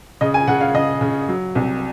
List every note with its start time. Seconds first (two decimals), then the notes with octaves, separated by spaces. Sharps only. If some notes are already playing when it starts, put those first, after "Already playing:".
0.21 C#3 D#5
0.34 G#5
0.48 C#3 F#5
0.61 F5
0.74 C#3 D#5
1.01 C#3
1.28 F#3
1.55 C2